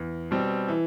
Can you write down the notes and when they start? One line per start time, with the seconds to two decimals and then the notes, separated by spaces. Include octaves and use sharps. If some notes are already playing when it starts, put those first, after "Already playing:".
Already playing: E2
0.31 B2 G3 C4
0.68 E3